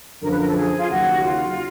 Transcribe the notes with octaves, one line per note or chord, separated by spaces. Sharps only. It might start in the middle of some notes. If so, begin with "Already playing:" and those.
F#2 D3 F3 A#4
B4
A#4
A4
G#4
F4
D#2 C#3 F#3 F#4
F4